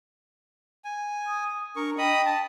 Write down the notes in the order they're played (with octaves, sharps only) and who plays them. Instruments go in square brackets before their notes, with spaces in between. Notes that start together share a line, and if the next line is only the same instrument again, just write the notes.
[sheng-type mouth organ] G#5
[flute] D#6
[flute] D4 [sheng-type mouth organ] A#4 C#6
[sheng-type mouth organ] D#5 B5 D#6 [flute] G5
[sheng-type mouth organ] A5